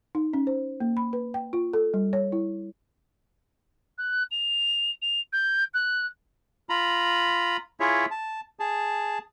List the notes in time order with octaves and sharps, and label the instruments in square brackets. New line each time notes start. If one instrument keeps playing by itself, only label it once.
[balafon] D#4
C#4
C5
A#3
B5
B4
G5
F4
A4
G3
C#5
E4
[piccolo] F#6
F7
F7
G6
F#6
[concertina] F4 A#5 B5
E4 F4 G#4 C#5 E5
A5
G#4 A5